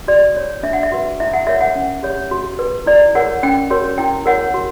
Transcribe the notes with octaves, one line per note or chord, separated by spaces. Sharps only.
F#4 D5
C#5
D4 E5
F#5
E5
F#4 B4
E4 E5
F#5
A#4 C#5 E5
F#5
C#4
G4 C#5
F#4
B4
E4 D5
A#4 C#5 F#5
C#4 G5
F#4 A#4 C#5
E4 G5
A#4 C#5 F#5
F#4